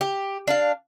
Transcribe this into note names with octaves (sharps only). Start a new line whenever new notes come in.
G4
D4 F5